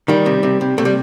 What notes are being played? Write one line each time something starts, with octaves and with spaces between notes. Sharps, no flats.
D#3 G3
C3
C3
C3
C3 A3
G3